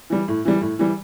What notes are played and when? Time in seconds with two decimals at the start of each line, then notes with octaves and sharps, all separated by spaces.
0.10 E3 G3
0.28 A2
0.45 E3 G3
0.61 A2
0.79 E3 G3